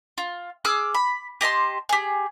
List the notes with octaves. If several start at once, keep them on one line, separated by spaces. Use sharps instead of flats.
F4
G#4 D6 E6 F6
B5
G4 D#5 A5 C6
G4 G#4